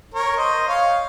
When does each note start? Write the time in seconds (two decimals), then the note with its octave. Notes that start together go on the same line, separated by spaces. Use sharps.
0.14 A#4 C#5
0.37 C5 D#5
0.68 C#5 F5